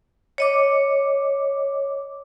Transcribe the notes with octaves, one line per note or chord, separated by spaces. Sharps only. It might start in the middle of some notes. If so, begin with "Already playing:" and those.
C#5 D#5 D6